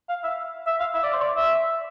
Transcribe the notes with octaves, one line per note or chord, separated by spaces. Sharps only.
F5
E5
E5
F5
E5
D5
C5
D5
E5